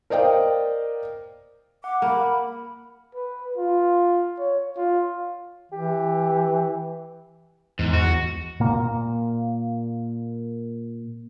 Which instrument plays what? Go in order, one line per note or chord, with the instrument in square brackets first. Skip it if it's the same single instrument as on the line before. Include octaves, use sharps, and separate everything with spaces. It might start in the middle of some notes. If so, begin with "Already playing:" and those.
[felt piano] A#4 C5 D5 D#5 F5 G5
[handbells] F#5 [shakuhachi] D6
[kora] A#3 [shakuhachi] B5
[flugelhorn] B4
F4
C#5
F4
[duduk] E3 [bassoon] G4
[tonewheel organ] E2 [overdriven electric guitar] G#2
[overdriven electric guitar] F#4
[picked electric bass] A#2 A#3